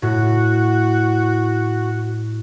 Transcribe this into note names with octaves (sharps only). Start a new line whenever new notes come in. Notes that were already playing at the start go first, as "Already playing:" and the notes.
A2 F#4